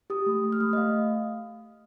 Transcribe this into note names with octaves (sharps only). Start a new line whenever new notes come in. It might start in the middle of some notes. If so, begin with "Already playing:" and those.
G4 D#6
A3
A3
F6
A3 D#6
D#5
A3 F5